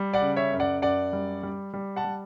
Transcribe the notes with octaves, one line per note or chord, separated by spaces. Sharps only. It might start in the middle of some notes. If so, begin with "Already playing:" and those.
Already playing: G3
D5 F#5
C#3
C#5 E5
F#2
D5 F#5
F#2 D5 F#5
G3
G3
G3
F#5 A5
G3